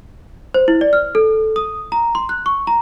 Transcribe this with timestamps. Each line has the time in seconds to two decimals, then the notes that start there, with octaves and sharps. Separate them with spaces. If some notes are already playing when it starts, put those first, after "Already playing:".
0.54 C5
0.68 E4
0.81 D5
0.93 F6
1.15 A4
1.56 D#6
1.92 A#5
2.15 C6
2.29 F#6
2.46 C#6
2.67 A#5